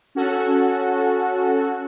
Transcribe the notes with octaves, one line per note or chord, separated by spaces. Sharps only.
C#4 F#4 A4